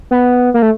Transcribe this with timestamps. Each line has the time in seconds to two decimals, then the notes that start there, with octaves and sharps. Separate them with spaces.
0.11 B3
0.54 A#3
0.62 A3